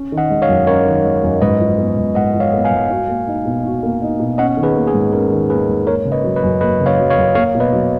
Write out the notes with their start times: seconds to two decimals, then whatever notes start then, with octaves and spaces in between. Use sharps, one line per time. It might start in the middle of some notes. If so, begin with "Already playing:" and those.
Already playing: C#4
0.12 D#3
0.18 D#5 F#5
0.30 G#3
0.42 C#5 F5
0.49 F#2
0.67 C#4 A#4 C#5
0.86 D#3
1.04 G#3
1.23 F#2
1.41 G#2 B4 D#5
1.60 F3
1.78 B3
1.97 G#2
2.15 G#2 D#5 F#5
2.34 F3
2.40 C#5 F5
2.53 B3
2.65 F5 G#5
2.71 G#2
2.90 F#4
3.08 A#3
3.27 D#4
3.45 B2
3.65 F#4
3.83 A#3
4.02 D#4
4.20 B2
4.38 C#4 D#5 F#5
4.57 D#3
4.63 G#4 B4
4.75 A#3
4.87 G#4
4.94 G#2
5.13 C#4 A#4
5.31 D#3
5.50 A#3 G#4 B4
5.68 G#2
5.86 A#3 A#4 C#5
6.05 C#3
6.12 B4 D#5
6.24 F#3
6.36 B4 D#5
6.43 F#2
6.61 A#3 B4 D#5
6.80 C#3
6.86 C#5 F5
6.98 F#3
7.10 C#5 F5
7.17 F#2
7.35 A#3 C#5 F5
7.55 B2
7.60 B4 D#5
7.73 F#3